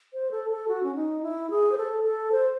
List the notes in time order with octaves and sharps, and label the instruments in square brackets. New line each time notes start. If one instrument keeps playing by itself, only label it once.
[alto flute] C5
A4
A4
F#4
C#4
D#4
E4
G#4
C5
A4
A4
C5